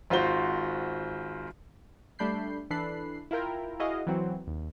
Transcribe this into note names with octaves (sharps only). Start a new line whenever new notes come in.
G#1 F4 F#4 C5 G7
G3 A3 D4 B5 G6 C7
E3 D4 A4 B5 F#6 C7
E4 F4 A#4 G5
E4 F#4 G#4 D#5 F5
E3 F#3 C4 F#4
D#2